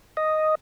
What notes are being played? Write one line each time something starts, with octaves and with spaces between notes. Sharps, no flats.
D#5